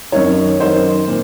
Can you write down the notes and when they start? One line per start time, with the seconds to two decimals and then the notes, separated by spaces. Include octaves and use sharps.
0.12 F#2 D#3 C#5
0.60 F#2 D#3 C5
1.08 A#2